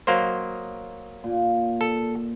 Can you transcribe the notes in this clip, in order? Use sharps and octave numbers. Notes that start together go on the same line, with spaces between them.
F#3 A#3 C5 D#5
A#2
A4